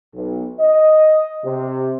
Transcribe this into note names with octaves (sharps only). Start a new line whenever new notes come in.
B1
D#5
C3